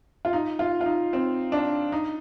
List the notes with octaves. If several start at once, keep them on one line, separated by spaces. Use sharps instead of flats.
F4
D#4
F4
F4
D#4
C4
D4
D#4